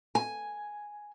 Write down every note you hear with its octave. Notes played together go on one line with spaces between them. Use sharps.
G#5